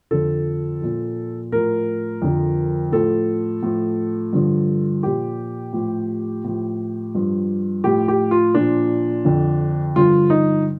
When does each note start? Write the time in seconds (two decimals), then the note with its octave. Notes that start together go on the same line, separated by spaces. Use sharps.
0.11 F2 D3 F3 A4
0.82 A#2 F3
1.52 A2 F3 A#4
2.22 F2 D3 F3
2.92 A2 F3 A4
3.63 A2 F3
4.33 G2 D3 F3
5.03 A#2 F3 G4
5.73 A2 F3
6.45 A2 F3
7.15 G2 F3
7.84 A2 F3 G4
8.08 G4
8.31 F4
8.55 A#2 F3 D4
9.25 F2 D3 F3
9.96 G2 D3 F3 F4
10.30 D#4